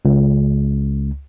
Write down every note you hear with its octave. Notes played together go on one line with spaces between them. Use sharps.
C#2